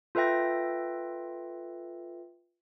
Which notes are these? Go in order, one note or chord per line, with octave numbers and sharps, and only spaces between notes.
F4 A4 B4 E5 G5 A#6